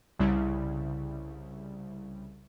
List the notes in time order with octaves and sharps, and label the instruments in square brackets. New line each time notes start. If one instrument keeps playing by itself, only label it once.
[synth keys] C2 C#3 G3 E4